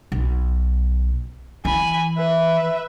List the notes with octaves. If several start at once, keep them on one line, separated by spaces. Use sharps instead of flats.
B1
E3 G#5 B5
B4 E5